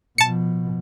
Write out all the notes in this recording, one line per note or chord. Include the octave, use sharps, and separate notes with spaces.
B2 F3 A5 C#7